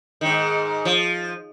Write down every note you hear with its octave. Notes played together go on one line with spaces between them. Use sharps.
G#2 D#3
F3